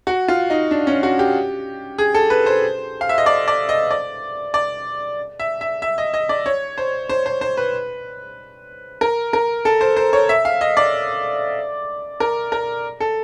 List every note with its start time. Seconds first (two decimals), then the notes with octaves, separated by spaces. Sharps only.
0.07 F#4
0.28 F4
0.50 D#4
0.71 D4
0.87 C#4
1.03 F#4
1.19 G4
1.98 G#4
2.14 A4
2.30 B4
2.46 C5
3.01 F5
3.09 E5
3.18 D#5
3.26 D5
3.48 D5
3.69 D#5
3.90 D5
4.54 D5
5.40 E5
5.61 E5
5.82 E5
5.98 D#5
6.14 D#5
6.29 D5
6.46 C#5
6.78 C5
7.09 C5
7.26 C5
7.41 C5
7.57 B4
9.01 A#4
9.33 A#4
9.65 A4
9.81 C5
9.96 C5
10.13 C#5
10.29 E5
10.45 F5
10.61 D#5
10.77 D5
12.20 A#4
12.52 A#4
13.00 A4